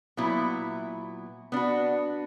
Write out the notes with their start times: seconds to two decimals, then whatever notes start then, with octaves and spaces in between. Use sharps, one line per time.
0.17 A#2 F#3 B3 E4
1.52 B3 D4 F#4